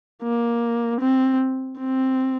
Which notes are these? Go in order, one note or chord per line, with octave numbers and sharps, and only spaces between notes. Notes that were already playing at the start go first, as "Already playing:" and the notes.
A#3
C4
C4